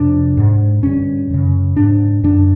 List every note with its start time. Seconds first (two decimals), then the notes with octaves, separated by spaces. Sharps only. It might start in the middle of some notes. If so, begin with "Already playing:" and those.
Already playing: F2 C3 D4
0.37 G#2
0.83 G2 D3 C#4
1.30 F#2 C#3
1.76 G#2 D4
2.24 F#2 D3 D4